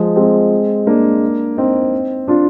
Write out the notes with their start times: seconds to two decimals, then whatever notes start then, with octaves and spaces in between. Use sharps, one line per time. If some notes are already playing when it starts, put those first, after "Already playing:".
Already playing: F3 G#3
0.16 G#3 C4
0.87 A#3 D4
1.57 C4 D#4
2.28 D4 F4